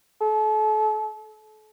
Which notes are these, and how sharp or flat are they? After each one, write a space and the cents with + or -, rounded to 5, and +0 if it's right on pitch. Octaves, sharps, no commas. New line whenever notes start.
A4 -35